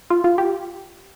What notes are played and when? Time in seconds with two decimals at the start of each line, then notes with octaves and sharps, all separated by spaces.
0.10 F4
0.24 F4
0.38 G4